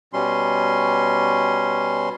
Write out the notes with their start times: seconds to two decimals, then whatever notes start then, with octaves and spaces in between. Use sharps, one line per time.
0.13 B2 G3 C#4 C6